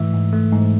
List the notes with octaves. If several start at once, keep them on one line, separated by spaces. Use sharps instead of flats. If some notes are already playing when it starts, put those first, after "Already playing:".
Already playing: G#2 E3 A3 E5
G#2
A3
G#2